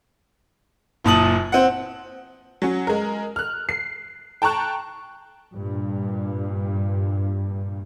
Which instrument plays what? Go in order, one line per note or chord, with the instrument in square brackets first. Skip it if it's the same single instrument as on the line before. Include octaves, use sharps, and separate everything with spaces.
[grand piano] F#1 A#2 A5 D#6 F#7
C4 F#5
[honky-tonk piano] F#3 C#4
G#3 A#4
F6 F#6
C7
G5 A5 A#5 C#6 F#6
[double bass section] G2 A#2